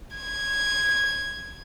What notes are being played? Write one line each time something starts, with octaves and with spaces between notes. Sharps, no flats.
G#6